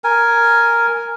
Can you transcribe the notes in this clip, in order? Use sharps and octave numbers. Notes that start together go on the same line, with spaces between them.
A#4 G#5